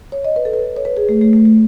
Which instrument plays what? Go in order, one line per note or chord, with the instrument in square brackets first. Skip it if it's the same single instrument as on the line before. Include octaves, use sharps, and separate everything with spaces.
[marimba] C#5
D#5
B4
A4
B4
C#5
B4
G#4
A3
A3
A3
A3